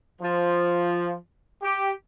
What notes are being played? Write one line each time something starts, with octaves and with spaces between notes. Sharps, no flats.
F3
G4